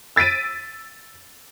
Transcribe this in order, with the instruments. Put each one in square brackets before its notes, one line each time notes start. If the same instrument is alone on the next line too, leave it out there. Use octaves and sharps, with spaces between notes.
[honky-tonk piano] E6 A6 B6 D7 D#7